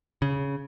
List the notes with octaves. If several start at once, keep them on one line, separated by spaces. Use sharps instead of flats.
C#3